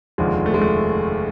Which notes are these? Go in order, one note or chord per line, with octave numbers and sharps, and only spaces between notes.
F1 D#2 D3 F3 G#3
A3
G#3
A3